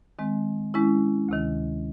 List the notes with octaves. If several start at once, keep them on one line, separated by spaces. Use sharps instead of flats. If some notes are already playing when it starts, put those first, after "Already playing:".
D#3 G#3 C4
D#3 G#3 C#4 E4
D2 C3 D#3